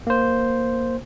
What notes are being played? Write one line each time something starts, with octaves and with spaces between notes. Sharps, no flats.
A#3 C5